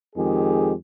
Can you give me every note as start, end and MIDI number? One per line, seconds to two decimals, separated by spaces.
0.16 0.72 41
0.16 0.72 51
0.16 0.72 56
0.16 0.72 67
0.16 0.72 68